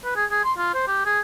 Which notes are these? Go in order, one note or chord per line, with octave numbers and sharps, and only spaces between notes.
B4
G#4
G#4
C6
F4
C5
G4
G#4